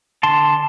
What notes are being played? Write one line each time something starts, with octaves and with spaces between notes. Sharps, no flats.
D3 A5 C6